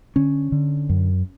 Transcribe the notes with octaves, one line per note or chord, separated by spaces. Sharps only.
D3 C#4
D3
F#2